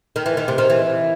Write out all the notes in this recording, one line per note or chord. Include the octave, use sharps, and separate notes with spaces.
D#3
E3
D#3
C3
D#3
E3